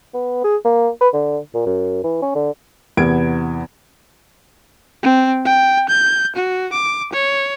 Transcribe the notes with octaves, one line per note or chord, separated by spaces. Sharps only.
B3
G#4
A#3
B4
D3
A#2
F#2
E3
C#4
D3
E2 C3 B3 G#6 D7
C4
G5
G6
F#4
D6
C#5